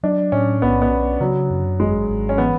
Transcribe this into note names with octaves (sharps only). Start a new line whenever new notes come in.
F#3 D4
A2 C#4
B1 B3
B3
C#4
C#3 F#3
F#2
G#1 G#3
G#1
C#4
E3 B3